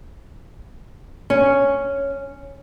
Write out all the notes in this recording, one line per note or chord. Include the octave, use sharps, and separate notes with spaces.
C#4